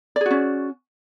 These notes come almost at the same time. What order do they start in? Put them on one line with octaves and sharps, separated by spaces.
D5 G#4 F#4 C#4